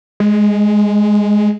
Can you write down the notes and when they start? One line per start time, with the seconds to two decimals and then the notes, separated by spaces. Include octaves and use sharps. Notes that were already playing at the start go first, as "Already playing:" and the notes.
0.20 G#3